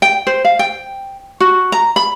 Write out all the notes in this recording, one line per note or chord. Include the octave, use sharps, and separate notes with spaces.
G5
C5
F5
G5
F#4
A#5
B5